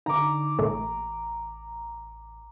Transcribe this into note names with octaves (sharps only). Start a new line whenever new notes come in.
D3 D#4 A#5 D6
A1 A#2 A3